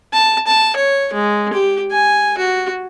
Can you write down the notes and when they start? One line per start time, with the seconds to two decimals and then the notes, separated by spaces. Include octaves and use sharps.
0.13 A5
0.47 A5
0.76 C#5
1.13 G#3
1.53 G4
1.91 G#5
2.38 F#4